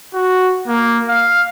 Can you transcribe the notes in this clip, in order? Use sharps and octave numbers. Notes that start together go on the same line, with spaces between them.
F#4
A#3
F5